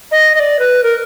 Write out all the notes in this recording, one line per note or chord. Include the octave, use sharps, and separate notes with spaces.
D#5
D#5
D5
B4
A#4